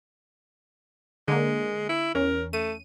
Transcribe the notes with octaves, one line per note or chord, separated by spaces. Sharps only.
D3 G#3 A#3
E4
E2 C#4 A#4
A3 D#7